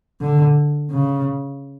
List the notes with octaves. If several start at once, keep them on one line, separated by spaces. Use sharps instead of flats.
D3
C#3